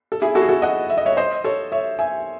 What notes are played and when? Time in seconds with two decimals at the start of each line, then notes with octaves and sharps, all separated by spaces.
0.12 A4
0.22 E4 G#4
0.35 F#4 A4
0.42 G#4
0.49 F#4 A4
0.62 D#5 F#5
0.90 E5
0.98 D#5
1.06 C#5 E5
1.17 C5 D#5
1.44 A4 C#5
1.72 C#5 E5
1.99 E5 G#5